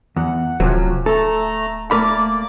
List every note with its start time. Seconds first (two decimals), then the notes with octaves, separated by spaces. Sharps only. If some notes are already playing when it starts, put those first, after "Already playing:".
0.16 E2 F#5
0.60 D1 C3 F3 F#3 C#4
1.06 A3 A4 A#5
1.91 A3 A#3 A#4 D5 B5 D6